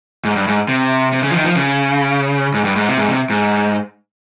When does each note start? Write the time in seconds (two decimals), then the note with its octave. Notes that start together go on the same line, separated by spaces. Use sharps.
0.25 G#2
0.36 G2
0.47 G#2
0.69 C3
1.12 C3
1.23 C#3
1.30 F3
1.34 D#3
1.44 F3
1.56 C#3
2.54 G#2
2.64 G2
2.76 G#2
2.87 C3
2.98 G#2
3.09 C3
3.30 G#2